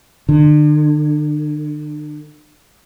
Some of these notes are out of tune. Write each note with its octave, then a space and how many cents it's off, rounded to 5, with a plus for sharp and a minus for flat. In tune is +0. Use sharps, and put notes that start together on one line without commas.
D3 +40